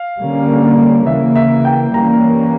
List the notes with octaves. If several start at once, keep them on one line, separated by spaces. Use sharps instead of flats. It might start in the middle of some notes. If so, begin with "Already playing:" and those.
Already playing: F5
D3 G3 A#3 C#4
C#3 E3 A#3 E5
E5
G5
E3 G3 A#3 C#4 A#5